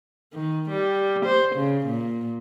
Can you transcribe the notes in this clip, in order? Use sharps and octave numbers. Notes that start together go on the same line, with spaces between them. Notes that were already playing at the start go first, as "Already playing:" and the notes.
D#3
G3
C5
C#3
A#2